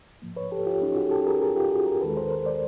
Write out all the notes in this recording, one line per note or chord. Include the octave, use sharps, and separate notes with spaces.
G#2 F3 A#3
B4 C#5
G4 A4
F4 G4
C#4 D#4
F#4 G#4
G4 A4
G#4 A#4
G#4 A#4
F4 G4
F#4 G#4
G#4 A#4
D#2 D#3 G#3 A4 B4
A#4 C5
A#4 C5
C5 D5